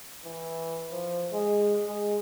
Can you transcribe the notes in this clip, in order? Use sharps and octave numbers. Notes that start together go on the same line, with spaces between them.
E3
F3
G#3
G#3